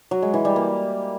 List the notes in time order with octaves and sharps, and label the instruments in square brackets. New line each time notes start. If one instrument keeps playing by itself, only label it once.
[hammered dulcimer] F#3
G#3
E3
G3
A#3